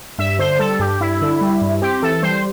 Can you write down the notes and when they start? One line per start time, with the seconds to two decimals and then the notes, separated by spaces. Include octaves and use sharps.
0.18 G2 E5
0.39 D3 C5
0.59 G3 A4
0.79 G2 G4
1.00 G2 E4
1.21 D3
1.41 G3
1.61 G2
1.82 C4 G4
2.02 E3 A4
2.23 G3 C5